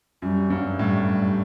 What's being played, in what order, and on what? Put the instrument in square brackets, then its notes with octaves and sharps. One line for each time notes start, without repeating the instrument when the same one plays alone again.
[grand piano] F#2 [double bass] G3
[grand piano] G2 [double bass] F#3
[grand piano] A2 [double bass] G3